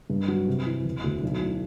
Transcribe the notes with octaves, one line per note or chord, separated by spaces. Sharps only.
G2
F#3
C3
E3
E1
D2
B1
A2